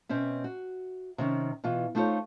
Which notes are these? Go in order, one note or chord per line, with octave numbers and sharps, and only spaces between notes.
B2 C4 C#4 E5
F#4
C3 D#3 C#4
B2 E3 F4
A3 D#4 F4 F#4 C5 C#5